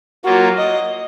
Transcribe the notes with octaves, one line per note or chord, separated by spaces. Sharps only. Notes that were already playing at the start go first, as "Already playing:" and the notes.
F#3 A#3 F4 F#4
D#5